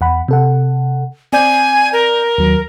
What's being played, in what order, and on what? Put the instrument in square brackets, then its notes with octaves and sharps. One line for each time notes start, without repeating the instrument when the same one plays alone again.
[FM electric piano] E2 F#5 B5
C3 A4 F#5
[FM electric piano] C4 D5 G6 [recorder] G#5
[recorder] A#4
[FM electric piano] D#2 F#3